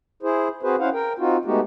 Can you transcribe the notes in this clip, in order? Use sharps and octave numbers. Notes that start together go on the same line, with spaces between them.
E4 G#4 C5
C4 F#4 G#4 B4 C5
C#4 E4 C5 F5 F#5
A#4 G5
C4 D#4 F4 F#4
G#3 A3 B3 D#4 F#4 G4